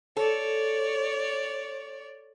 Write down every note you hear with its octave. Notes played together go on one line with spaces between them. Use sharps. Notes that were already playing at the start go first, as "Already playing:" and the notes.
A4 C#5 D5